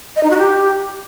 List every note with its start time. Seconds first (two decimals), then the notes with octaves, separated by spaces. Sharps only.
0.16 D#5
0.23 D#4
0.30 F#4
0.38 G4